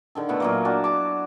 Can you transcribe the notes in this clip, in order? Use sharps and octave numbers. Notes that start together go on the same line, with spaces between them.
D3 D#3 A4
B2 A3 E4 F#5
A#2 F#3 A#3
D4 F#4 A5
A5 D6